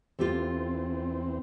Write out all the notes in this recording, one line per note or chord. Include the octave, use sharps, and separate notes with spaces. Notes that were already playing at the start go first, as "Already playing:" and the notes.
E2 C4 F4 G4 A4